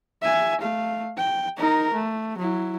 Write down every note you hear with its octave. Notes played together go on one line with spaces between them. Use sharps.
E5 G#5
A3 F5
G5
D#4 A#4
A3
F#3 E4